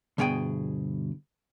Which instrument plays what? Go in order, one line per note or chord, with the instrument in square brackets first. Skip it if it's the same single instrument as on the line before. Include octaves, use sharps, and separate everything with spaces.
[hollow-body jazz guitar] D2 G2 B2 G#4 G5 G#5